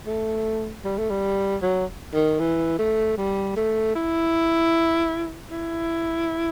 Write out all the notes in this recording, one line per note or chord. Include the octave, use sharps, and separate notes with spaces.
A3
G3
A3
G3
F#3
D#3
E3
A3
G3
A3
E4
E4